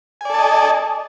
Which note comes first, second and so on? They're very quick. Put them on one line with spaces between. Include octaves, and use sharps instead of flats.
G#5 D5 A4 A5 D#5